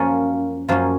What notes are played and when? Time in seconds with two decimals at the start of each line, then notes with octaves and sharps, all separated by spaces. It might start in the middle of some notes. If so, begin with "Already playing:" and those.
Already playing: F#2 F3 A#3 C#4 F4
0.68 F#2 F3 A#3 C#4 F4